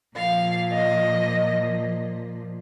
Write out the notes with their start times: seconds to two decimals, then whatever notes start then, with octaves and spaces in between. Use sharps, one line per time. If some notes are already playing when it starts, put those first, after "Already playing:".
0.16 A#2 F3 F5
0.72 D#5